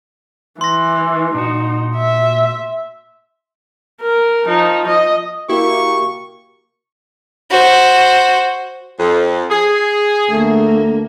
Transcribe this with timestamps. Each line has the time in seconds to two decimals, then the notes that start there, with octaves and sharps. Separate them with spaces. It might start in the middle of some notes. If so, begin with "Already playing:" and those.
0.61 E3 C6 A#6
1.34 A#2 D#4 F#4
1.96 E5
4.01 A#4
4.45 F3 D#4
4.88 D#5
5.49 A#3 E4 F#4 G4 A#4 C#6
7.51 F#4 C5
9.00 F2
9.51 G#4
10.31 D2 A3 A#3